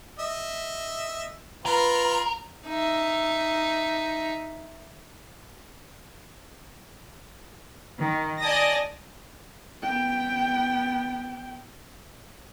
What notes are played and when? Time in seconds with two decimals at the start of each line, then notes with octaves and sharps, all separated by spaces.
0.19 D#5 E5
1.66 F4 A#4 B4 A#5 B5
2.68 D#4 E5
8.04 D#3
8.40 D5 D#5 G#5 A5 D#6 A#6
9.83 B3 G5